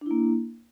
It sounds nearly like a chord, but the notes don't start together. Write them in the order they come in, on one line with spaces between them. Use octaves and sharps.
D4 E4 A#3